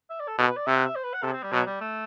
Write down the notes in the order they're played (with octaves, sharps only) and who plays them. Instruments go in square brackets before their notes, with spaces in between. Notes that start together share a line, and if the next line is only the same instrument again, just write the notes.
[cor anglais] E5
D5
A4
[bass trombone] B2 [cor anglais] A4
[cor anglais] B4
D5
[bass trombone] C3 [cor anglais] E5
[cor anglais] F#5
E5
C5
B4
F#5
[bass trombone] C3 [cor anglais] A4
[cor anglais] C4
G3
[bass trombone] B2 [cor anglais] F#3
[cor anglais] G3
A3